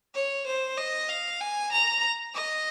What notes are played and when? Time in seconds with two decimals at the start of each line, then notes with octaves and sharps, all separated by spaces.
0.15 C#5
0.46 C5
0.77 D#5
1.09 F5
1.41 G#5
1.72 A#5
2.34 D#5